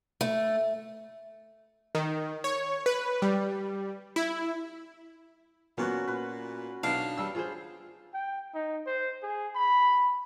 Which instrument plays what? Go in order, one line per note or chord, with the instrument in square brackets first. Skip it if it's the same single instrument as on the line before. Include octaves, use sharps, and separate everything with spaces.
[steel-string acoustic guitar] A3
[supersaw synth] D#3
C#5
B4
G3
E4
[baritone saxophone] A#2 [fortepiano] F#3 B3 [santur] C#4 F#4
[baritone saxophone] A#2 [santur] B4
[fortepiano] B1 D#4 [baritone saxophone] D4 [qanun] F5
[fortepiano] G3 E6
F4 G#4 C5
[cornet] G5
D#4
C5
G#4
B5